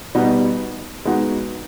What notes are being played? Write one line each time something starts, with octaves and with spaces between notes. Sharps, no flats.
B2 G3 B3 D#4
G#3 B3 D#4 F#4